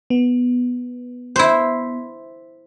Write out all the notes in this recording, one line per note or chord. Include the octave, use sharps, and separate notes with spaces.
B3
E4 C5